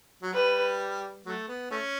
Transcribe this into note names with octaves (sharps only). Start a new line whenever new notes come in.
F#3
G3 B4
F#3 A3
B3
A3 C#4